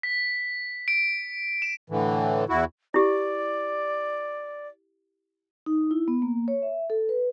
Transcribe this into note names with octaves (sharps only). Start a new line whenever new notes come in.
B6
D7
E7
A2 D3 E3
E2 E4 F#4
E4 G4 D5
D#4
E4
B3
A#3
C#5
E5
A4
B4